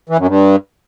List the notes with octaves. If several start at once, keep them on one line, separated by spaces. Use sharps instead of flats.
E3
F#2
G2